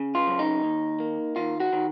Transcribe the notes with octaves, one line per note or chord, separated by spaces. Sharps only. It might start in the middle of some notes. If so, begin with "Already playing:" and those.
Already playing: C#3
F4
F#2
D#4
D#2
A#3
D#3 F4
F#4
D#3